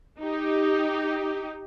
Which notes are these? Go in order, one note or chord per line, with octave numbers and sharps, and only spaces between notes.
D#4 G4